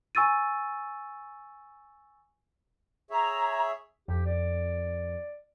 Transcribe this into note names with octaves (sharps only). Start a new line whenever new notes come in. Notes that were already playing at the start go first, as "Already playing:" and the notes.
G#5 C#6 E6 A6 D#7
G#4 C#5 E5 A#5
F2 G4
D5